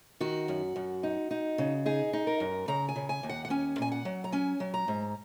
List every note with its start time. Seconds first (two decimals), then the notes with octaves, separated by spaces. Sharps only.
0.20 D#3 F#4
0.48 F#2
0.76 F#2
1.03 D#4
1.31 D#4
1.58 C#3
1.86 D#4 G#4
2.13 D#4
2.27 A#4
2.40 F#2
2.68 C#3 A#5
2.89 G#5
2.96 C#3
3.09 G#5
3.23 D#2
3.29 F#5
3.45 F#5
3.50 C#4 G#5
3.78 A#2 G#5
3.92 F#5
4.05 F#3
4.24 A#5
4.32 C#4 G#5
4.60 F#3
4.74 A#5
4.88 G#2